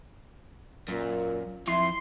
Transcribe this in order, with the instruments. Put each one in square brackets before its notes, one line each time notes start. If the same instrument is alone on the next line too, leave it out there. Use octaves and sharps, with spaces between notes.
[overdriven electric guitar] F#2 [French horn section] A#2
[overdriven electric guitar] F2 F3 [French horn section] E4 [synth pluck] C6